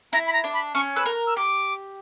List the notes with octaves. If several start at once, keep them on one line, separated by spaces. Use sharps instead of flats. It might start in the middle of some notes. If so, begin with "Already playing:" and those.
E4 A#5
B5
A#5
D4
B5
C#4 C#6
B4 E6
A#4
E6
G4 D6